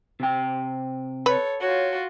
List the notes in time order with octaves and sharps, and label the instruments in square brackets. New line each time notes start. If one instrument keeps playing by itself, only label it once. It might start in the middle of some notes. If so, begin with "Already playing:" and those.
[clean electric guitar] C3 G5
[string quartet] A4 C#5 [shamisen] B4
[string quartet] F4 F#4 [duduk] C#5